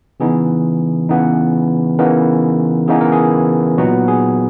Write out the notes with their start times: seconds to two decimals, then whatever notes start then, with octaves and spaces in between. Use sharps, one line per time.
0.20 C#3 E3 B3 D#4 G#4
1.09 C#3 E3 B3 D#4
1.99 C#3 E3 B3 D#4 A#4
2.88 C#3 E3 B3 D#4 G#4
3.01 A#4
3.12 G#4
3.78 A#2 F#3 B3 D#4 F#4
4.08 G#4